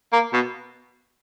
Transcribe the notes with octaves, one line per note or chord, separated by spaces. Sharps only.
A#3
B2